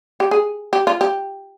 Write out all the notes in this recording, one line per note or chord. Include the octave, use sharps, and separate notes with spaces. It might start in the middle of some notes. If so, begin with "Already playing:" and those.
G4
G#4
G4
F4
G4